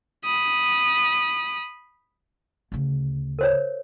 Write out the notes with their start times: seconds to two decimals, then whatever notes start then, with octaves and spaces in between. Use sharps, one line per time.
0.25 B5 D#6
2.72 D2 C#3
3.39 A#4 C5 C#5